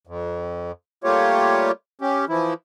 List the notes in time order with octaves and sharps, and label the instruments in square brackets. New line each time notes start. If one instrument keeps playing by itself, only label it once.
[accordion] F2
G3 A3 A#3 F4 G4 C#5
C#4 G4
E3 F3 E4